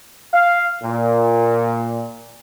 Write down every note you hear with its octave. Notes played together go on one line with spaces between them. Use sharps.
F5
A#2